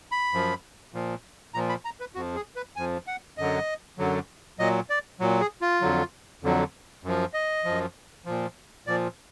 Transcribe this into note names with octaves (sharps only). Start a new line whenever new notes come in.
B5
F#2 F3
A#2 F3
A#2 F3 A#5
B5
A#5
B4
F2 F3 F#4
G#4
B4
F2 F3 G#5
F#5
F#2 D3 F#3 D#5
F#2 D3 F#3
A#2 F#3 D#5
D5
A#2 F#3
G#4
F4
F2 D3 F#3
F2 D3 F#3
F#2 F3
D#5
F#2 F3
A#2 F3
A#2 F3 D5